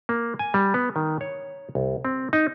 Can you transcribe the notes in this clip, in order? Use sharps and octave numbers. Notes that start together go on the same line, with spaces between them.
A#3
G#5
G3
B3
D#3
C#5
C2
C4
D#4